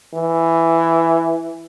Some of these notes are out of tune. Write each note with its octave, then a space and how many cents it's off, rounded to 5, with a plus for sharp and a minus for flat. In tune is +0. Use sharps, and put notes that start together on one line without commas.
E3 +5